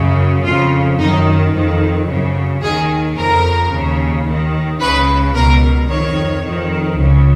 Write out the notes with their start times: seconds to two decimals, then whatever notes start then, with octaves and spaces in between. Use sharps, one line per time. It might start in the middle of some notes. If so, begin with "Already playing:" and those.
Already playing: F#2 C#3
0.44 F2 C#3 F4
0.98 F#2 D#3 D#4
1.53 F2 D#3
2.07 F#2 C#3
2.62 D#2 D#3 G#4
3.17 F2 C#3 A#4
3.71 D#2 C#3
4.25 D#2 D#3
4.80 C#2 C#3 B4
5.35 C#2 B2 A#4
5.89 F2 D#3 C#5
6.44 F2 D#3
6.97 C#2 C#3